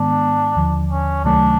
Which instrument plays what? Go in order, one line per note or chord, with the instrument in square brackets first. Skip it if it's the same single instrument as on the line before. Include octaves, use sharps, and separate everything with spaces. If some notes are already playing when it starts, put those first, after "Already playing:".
Already playing: [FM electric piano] G#2 D#3 G#3 B3 [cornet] D4
[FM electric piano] D#2 D3 F3
[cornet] C#4
[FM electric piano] C#2 C3 D#3 F#3 A3 [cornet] D4